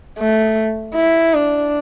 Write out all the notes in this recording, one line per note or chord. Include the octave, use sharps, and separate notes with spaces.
A3
E4
D4